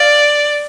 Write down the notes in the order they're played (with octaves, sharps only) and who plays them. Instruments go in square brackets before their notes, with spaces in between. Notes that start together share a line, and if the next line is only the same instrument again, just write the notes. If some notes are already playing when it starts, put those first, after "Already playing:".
Already playing: [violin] D5 [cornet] F5